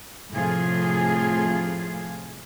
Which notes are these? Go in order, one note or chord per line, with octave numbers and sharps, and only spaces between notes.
A2 C3 F3 A3 F4 G#4